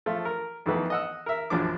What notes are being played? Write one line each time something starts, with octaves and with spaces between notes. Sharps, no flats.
F3 A3 F4
A#4
F2 D#3 E3 A3 B3
D#5 F#5 E6
A#4 E5
A#1 F#2 F3 D4 D6